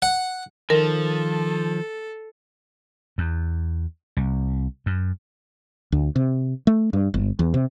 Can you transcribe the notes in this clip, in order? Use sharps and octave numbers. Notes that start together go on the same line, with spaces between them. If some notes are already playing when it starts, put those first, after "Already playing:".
F#5
D#3 F3 A4 A#4
E2
C2
F#2
D2
C3
A3
G2
G1
E2
C3